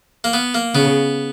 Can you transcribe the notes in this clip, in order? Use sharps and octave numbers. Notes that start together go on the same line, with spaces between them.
A#3
B3
A#3
C#3 B3